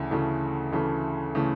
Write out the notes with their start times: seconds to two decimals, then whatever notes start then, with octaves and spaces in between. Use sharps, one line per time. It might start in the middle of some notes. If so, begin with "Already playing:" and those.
Already playing: D2 C#3 E3 A3
0.11 D2 C#3 E3 A3
0.72 D2 C#3 E3 A3
1.35 C#3 E3 A3